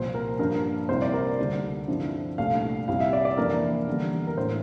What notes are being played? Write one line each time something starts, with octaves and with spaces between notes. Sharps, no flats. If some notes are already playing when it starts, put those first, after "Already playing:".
Already playing: C2 A#2 F3 C5
A#4
G2 F3 A#3 D4 A#4
C2 C3 G3 A#3 E4 C5
D5
A#4
D2 D3 G3 D4
G2 D3 F3 C4 E4
C2 A#2 A3 D4 F5
C2 C3 G3 C4 E4 F5
E5
D5
D5
F2 E3 A#3 D4 A#4
E2 D3 G3
A#4
A2 E3 A#3 D4 C5